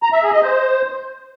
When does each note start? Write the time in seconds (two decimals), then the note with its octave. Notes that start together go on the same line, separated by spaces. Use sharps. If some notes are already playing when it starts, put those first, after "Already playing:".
0.03 A#5
0.13 E5
0.23 G#4
0.33 D#5
0.43 C5